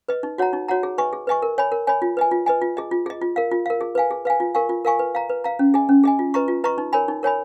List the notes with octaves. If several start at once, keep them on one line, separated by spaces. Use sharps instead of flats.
B4 D#5
D#4
F#4 C#5 F#5 A#5
D#4
F#4 C#5 F#5 A#5
G#4
B4 D#5 G#5 C#6
G#4
B4 D#5 G#5 C#6
A#4
C#5 G#5 B5
A#4
C#5 G#5 B5
F4
B4 D#5 G#5
F4
B4 D#5 G#5
F4
G#4 D#5
F4
G#4 D#5
F4
A#4 F5
F4
A#4 F5
G#4
B4 F5 G#5
G#4
B4 F5 G#5
F4
A#4 F5 G#5 C#6
F4
A#4 F5 G#5 C#6
B4
F5 A#5
B4
F5 A#5
C#4
G#4 D#5 G#5
C#4
G#4 D#5 G#5
F4
B4 D#5 A#5 C#6
F4
B4 D#5 A#5 C#6
D#4
A#4 C#5 G#5 B5
D#4
A#4 C#5 G#5 B5